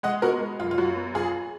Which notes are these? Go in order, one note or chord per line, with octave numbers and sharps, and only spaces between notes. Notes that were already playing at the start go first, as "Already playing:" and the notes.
G#3 D#5 F#5
B3 F#4 A#4
G#3
F#2 F4
F4
F#2 F#4
B3
F#2 F4 G#4